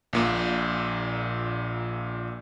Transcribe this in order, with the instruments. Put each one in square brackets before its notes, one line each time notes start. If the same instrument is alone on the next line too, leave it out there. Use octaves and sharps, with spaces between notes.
[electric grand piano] A#1 A#2 A#3